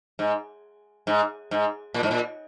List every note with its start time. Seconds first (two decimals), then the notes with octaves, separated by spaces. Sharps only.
0.19 G#2
1.07 G#2
1.51 G#2
1.94 A#2
2.03 G#2
2.11 A#2